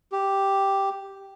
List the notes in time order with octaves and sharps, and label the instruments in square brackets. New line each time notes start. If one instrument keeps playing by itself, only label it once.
[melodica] G4